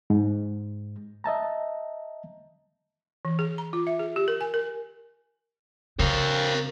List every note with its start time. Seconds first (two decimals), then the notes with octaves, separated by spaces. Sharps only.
0.10 G#2
1.24 D#5 E5 A5 A#5
3.25 E3
3.39 G#4
3.58 A#5
3.73 F4
3.87 E5
3.99 G#4
4.16 G4
4.28 A#4
4.41 G#5
4.54 A#4
5.99 C#3 C4 A#4 C#5 F5